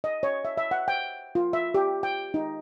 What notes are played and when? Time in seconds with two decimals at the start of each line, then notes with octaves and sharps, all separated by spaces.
0.04 D#5
0.23 C#5
0.45 E5
0.58 E5
0.71 F#5
0.88 G5
1.35 F4
1.53 E5
1.74 G4
2.03 G5
2.34 D#4